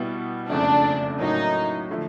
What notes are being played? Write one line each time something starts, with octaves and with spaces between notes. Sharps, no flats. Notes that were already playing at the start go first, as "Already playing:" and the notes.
Already playing: B2 G3 B3 E4 G4
F#1 F2 C#3 F3 A3 D4
A2 F#3 A#3 C#4 D#4
D3 F3 A3